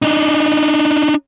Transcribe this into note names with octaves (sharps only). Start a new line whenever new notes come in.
D4 D#4